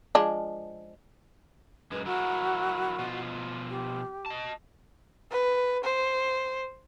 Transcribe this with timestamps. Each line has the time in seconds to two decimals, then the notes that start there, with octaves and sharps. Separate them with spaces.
0.15 F3 G#3 D4
1.92 F#2 G#3 B4
2.06 F#3 E4 F#4 A#4
2.99 B2 F3 F4
3.70 G4
4.26 D#5 A5
5.31 B4
5.84 C5